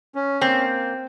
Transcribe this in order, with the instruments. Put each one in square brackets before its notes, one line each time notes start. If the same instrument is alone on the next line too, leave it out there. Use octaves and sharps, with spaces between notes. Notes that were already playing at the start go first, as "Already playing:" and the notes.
[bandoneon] C#4
[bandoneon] A#3 [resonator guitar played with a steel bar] C4